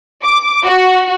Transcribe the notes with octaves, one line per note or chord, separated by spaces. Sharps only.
D6
F#4